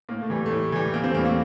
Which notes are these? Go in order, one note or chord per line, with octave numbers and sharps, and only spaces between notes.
A2 A#3
A3
E3 G3
A2 A3
E3 G3
E2 A#3
C4
A3
E3 G3 A#3
A#3